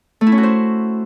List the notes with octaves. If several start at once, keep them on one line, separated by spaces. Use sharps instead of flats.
A3
E4
C#4
F#4
C5